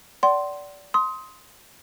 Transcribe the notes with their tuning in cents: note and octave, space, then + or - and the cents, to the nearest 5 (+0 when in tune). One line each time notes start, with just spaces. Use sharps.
D5 -20 F#5 +40 C6 +0
C6 +0 D#6 +25